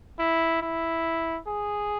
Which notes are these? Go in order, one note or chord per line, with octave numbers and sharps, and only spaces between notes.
E4
E4
G#4